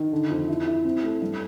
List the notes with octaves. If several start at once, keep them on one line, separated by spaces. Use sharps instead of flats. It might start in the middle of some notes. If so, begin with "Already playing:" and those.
Already playing: D#3
D3
F2
E4
E4
C4
A3
G2